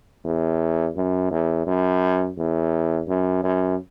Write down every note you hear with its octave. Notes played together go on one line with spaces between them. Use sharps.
E2
F#2
E2
F#2
E2
F#2
F#2